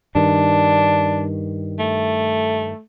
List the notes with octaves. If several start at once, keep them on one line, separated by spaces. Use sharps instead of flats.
G2 D#3 D4
A3